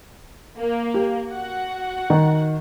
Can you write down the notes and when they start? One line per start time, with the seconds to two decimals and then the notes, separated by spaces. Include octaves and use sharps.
0.60 A#3
0.94 G4
1.31 F#4 F#5
2.10 D#3